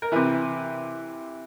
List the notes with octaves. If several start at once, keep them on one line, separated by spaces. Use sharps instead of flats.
A#4
C3 E3 B4